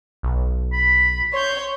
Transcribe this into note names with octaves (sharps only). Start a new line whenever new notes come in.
B1
B5
C#5 C6 G6